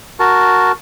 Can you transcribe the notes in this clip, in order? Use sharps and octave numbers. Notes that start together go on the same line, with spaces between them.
F#4 A#4 A5